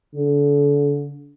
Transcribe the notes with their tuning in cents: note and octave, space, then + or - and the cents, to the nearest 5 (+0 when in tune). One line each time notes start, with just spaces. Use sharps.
D3 -35